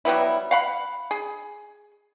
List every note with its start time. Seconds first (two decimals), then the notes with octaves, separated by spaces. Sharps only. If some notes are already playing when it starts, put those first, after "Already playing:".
0.05 F#3 G3 B3 E4
0.51 F5 F#5 B5
1.11 G#4